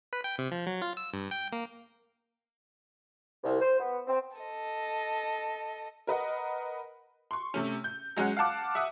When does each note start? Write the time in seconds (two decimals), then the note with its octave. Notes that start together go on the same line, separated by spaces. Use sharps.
0.13 B4
0.24 G5
0.38 C3
0.52 F3
0.67 F#3
0.82 F4
0.97 E6
1.14 G2
1.31 G5
1.52 A#3
3.43 C2
3.60 C5
3.79 B3
4.07 C4
4.37 A4 D#5
6.07 A#4 B4 D#5 F#5
7.31 C6 C#6
7.54 C3 A3 C#4
7.84 G6
8.17 F#3 G#3 C#4 F#5
8.37 F5 F#5 A5 D6
8.75 E5 F#5 D6 D#6